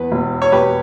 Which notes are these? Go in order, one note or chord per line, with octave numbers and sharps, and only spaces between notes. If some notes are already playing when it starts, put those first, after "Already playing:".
Already playing: E2 B4
E1
C#5
E1 G4 B4